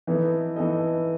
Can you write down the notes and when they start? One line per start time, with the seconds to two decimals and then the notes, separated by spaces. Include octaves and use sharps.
0.07 E3 B3 D#4 A4 D#5
0.56 E3 B3 D#4 A4 D#5